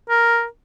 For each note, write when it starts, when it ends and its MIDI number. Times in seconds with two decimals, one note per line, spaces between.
0.10 0.45 70